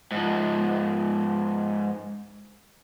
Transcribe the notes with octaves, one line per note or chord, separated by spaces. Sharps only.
G#2 F3